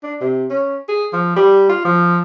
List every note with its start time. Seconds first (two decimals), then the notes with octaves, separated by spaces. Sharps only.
0.03 D4
0.21 C3
0.50 C#4
0.89 G#4
1.13 F3
1.36 G3
1.69 F4
1.85 F3